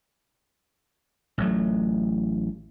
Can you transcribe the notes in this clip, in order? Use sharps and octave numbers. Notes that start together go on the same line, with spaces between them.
A1 F#3 A3